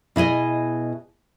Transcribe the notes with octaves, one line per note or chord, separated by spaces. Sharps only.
B2 E4 G#4 D#5